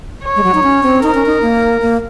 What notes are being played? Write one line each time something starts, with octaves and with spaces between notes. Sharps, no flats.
C#5
G#3
F#3
D#4
C#4
C4
D#4 A#4
C#4
D#4
A#3
A#3